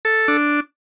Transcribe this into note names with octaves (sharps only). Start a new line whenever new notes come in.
A4
D4